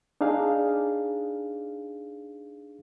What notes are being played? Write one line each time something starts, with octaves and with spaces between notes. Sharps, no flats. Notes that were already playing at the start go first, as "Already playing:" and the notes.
D4 D#4 G#4 F5